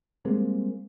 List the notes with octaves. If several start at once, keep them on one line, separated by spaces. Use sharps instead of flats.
G3 G#3 A#3 C4